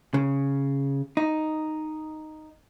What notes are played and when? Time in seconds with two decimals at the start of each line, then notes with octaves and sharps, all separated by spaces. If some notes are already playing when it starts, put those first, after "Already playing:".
0.14 C#3
1.17 D#4